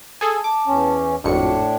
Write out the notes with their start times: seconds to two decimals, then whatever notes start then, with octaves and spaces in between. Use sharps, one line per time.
0.21 G#4 A4 G#5
0.44 A5 D6
0.67 E2 C#4
1.24 G#1 F2 A2 D4 F#4 C#7